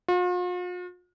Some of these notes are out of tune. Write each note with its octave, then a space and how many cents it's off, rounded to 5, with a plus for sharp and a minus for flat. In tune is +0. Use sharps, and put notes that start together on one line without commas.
F4 +45